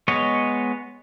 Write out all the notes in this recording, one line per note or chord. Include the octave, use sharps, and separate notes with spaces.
G#3 B3 C#5 D#5